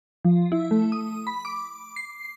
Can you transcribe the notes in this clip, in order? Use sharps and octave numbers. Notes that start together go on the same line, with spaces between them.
F3
E4
A3
D#6
B5
D6
C7